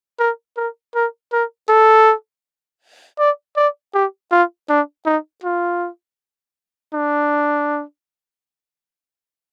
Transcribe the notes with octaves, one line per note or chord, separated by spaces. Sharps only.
A#4
A#4
A#4
A#4
A4
D5
D5
G4
F4
D4
D#4
F4
D4